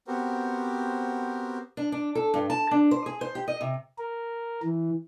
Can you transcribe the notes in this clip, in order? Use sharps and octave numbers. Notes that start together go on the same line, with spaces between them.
B3 C4 F#4 G4 A#4 C5
D4
D4
A4
G2
A5
D4
C5
G#4
C5
G4
D#5
C3
A#4
E3